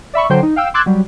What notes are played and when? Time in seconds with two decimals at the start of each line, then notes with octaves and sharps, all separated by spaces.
0.14 D5 E5 B5 C#6
0.30 D3 F#3 C5 G5
0.43 D#4
0.56 F5 G5 E6
0.74 C6 D6 E6 F#6 G#6 A6
0.86 F#3 G3